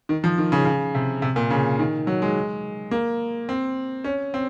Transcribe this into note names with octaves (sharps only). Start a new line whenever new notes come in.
D#3
F3
D#3
C#3
C#3
C3
C3
A#2
C#3
D#3
F#3
G#3
A#3
C4
C#4
C4